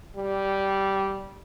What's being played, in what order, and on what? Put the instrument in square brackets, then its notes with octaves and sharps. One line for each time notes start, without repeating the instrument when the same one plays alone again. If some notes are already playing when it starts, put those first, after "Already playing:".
[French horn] G3